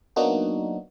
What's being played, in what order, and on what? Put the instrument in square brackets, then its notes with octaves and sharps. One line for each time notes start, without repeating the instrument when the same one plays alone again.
[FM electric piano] F#3 A#3 B3 D4 D#4 F#4